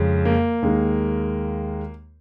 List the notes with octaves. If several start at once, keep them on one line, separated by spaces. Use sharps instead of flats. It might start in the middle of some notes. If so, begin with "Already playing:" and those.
Already playing: F2 C#3 G#3
A#3
D#2 D#3 G#3